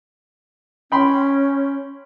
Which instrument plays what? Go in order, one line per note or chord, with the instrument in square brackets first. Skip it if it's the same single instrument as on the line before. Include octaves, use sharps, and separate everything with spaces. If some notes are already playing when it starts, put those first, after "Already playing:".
[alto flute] C#4 [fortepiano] G5 B5 C6